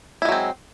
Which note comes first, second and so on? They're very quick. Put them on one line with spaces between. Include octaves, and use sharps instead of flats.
E4 G#3 F#3 C4